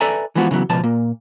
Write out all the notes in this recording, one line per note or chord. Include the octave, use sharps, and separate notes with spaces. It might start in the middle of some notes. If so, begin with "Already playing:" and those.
A4 B4 D5 E5 G#5 A#5
E3 F3 G#3 B3 F4 F#4
C#3 E3 F#3 B3
C#2 B2 F3 A5
A#2 A#3